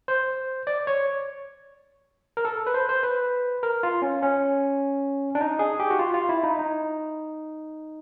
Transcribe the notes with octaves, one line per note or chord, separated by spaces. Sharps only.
C5
D5
C#5
A#4
A4
B4
C5
C5
B4
A#4
F4
C#4
C#4
D4
D#4
G#4
G4
F#4
F4
F4
E4
D#4
D#4